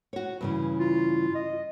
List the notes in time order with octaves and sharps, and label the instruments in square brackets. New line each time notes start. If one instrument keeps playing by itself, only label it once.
[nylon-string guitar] F#4 C#5
G2 C#3 E3
[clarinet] F4
D#5